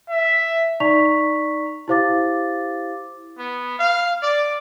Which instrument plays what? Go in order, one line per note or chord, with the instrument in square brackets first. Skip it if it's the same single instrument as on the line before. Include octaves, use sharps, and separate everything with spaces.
[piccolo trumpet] E5
[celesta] D#4 D5 A#5 C#6 B6 F7
E4 G4 C5 F5 D6 A6
[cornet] B3
F5
D5